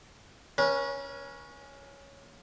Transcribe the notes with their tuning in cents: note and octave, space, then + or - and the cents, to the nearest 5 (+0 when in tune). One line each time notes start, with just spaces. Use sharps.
C#4 +0 B4 -45